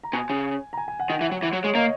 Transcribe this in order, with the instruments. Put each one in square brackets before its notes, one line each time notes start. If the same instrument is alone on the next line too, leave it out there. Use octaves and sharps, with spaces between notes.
[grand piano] A#5
[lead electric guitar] B2 [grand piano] G#5
[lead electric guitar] C#3
[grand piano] A#5
G#5
G#5
F#5
[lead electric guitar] D#3
E3
F#3
E3
F#3
[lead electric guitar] G#3 [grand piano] C#5
[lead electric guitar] A#3 [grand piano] D#5